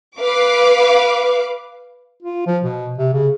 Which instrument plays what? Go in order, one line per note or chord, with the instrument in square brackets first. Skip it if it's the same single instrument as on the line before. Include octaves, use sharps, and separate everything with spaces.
[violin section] B4 F5 D6
[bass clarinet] F4
F3
B2
C3
C#3